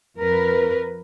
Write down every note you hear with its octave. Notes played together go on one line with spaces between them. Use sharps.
F2 A#4 B4